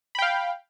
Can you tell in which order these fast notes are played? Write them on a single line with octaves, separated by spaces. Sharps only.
B5 G5 F5